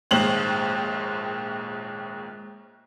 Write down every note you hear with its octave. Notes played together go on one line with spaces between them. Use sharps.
A#1 D#2 G#2 C5 F#7